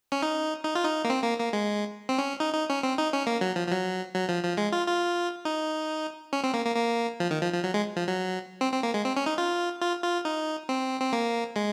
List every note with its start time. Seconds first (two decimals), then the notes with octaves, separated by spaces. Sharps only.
0.12 C#4
0.22 D#4
0.65 D#4
0.75 F4
0.85 D#4
1.04 A#3
1.10 C4
1.23 A#3
1.39 A#3
1.53 G#3
2.09 C4
2.18 C#4
2.40 D#4
2.54 D#4
2.70 C#4
2.83 C4
2.98 D#4
3.13 C#4
3.27 A#3
3.41 F#3
3.56 F3
3.67 F3
3.71 F#3
4.15 F#3
4.29 F3
4.44 F3
4.57 G#3
4.72 F4
4.87 F4
5.45 D#4
6.33 C#4
6.44 C4
6.54 A#3
6.66 A#3
6.76 A#3
7.20 F3
7.31 D#3
7.42 F3
7.53 F3
7.64 F#3
7.74 G#3
7.96 F3
8.08 F#3
8.61 C4
8.72 C4
8.83 A#3
8.94 G#3
9.05 C4
9.17 C#4
9.26 D#4
9.38 F4
9.82 F4
10.03 F4
10.25 D#4
10.69 C4
11.01 C4
11.13 A#3
11.56 G#3